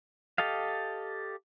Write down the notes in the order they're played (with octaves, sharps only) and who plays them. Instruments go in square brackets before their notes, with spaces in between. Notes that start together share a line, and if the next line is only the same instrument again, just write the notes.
[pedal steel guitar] G4 A4 D#5 F5